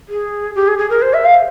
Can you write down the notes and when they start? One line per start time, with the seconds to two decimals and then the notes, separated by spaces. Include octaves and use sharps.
0.09 G#4
0.55 G4
0.68 G#4
0.78 G#4
0.90 A#4
1.02 C5
1.14 E5
1.25 F5